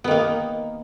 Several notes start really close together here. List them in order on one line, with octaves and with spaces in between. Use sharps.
B3 D#3 A#3